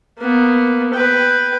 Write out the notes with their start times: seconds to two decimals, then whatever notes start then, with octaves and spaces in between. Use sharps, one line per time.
0.19 A#3 B3
0.94 B4 G5